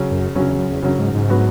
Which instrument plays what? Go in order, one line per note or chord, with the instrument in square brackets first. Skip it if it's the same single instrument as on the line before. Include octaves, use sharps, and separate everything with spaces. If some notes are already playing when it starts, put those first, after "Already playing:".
Already playing: [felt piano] C#3 F#3 C#4
[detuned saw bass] F#2
[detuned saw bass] F#2 [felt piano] C#3 F#3 C#4
[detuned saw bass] E2
F#2
E2
[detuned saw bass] F#2 [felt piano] C#3 F#3 C#4
[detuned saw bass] G#2
G#2
[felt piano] F#3 B3 F#4